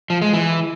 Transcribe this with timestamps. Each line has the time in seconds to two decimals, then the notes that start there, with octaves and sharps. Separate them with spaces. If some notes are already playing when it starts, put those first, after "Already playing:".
0.10 F3
0.22 G#3
0.33 E3